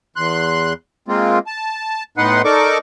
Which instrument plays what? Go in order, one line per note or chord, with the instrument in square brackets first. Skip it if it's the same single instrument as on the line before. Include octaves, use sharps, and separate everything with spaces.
[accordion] E2 C6 F#6
G#3 A#3 C4 F4
A5
A2 B3 D#4 B4 F#5 C6
D#4 A4 A#4 D5 C#6 D6